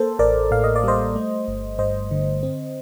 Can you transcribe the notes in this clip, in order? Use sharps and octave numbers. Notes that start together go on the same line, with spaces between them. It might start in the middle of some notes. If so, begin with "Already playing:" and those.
Already playing: A#3 A4 C5
A1 A#4 D5
A2 F5
D#5
D5
G3 C5 D#5
A3
G1
G2 C5 D#5
D3
C4